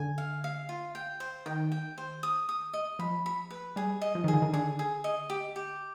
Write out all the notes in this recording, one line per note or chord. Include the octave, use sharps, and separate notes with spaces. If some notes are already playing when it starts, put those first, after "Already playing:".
Already playing: D3 G#5
F5
F5
F4
G5
C5
D#3 G5
G5
C5
D#6
D#6
D#5
F3 B5
B5
B4
G3 G#4
D#5
F3
D#3 G#4
D3
D#3
D3 G#4
G#4
D#5
G4
G4